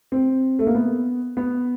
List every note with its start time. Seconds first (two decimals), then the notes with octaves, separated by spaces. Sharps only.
0.12 C4
0.59 A3
0.67 A#3
0.75 B3
1.37 B3